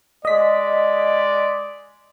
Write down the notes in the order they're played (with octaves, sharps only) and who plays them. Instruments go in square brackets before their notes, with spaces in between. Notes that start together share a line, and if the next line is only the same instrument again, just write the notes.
[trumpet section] G#3 D5 [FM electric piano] D#5 B6